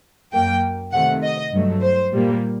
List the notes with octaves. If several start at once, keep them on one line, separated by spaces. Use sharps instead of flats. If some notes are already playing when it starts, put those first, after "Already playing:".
F#2 F#3 A#3 G5
C3 D#3 A3 F#5
D#5
G2 F#3 A3
C5
A#2 G3 A#3